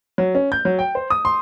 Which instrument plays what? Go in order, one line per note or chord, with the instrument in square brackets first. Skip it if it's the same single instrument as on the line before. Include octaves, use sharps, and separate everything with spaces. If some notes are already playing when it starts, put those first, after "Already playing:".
[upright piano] F#3
C#4
G6
F#3
G5
C5
D#6
C6